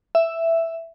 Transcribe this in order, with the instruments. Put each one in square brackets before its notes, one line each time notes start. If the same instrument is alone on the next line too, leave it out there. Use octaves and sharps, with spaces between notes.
[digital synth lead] E5